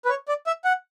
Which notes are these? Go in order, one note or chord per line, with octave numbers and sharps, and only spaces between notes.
B4
C#5
D5
E5
F#5